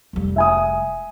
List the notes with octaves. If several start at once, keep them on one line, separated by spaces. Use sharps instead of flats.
F1 G3
E5 G#5 D#6